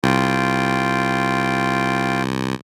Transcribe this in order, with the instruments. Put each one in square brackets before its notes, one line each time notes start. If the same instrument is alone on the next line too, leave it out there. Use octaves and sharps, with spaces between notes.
[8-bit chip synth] C2 [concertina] F4 G5